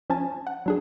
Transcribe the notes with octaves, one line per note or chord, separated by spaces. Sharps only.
F3 C#4 G#5 A5
F#5
F#3 D4 G#4